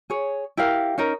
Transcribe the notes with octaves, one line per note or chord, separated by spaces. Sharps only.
G#4 C#5
E4 G4 A#4 F5
C#4 D#4 A#4